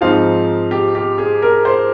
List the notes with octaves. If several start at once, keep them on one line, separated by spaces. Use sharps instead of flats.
G#2 F3 C4 D#4 F5
G4
G4
G#4
A#4
C5